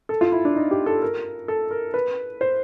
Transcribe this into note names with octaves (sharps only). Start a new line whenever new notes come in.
A4
F4
E4
D4
D#4
G4
A4
A#4
A4
A#4
B4
C5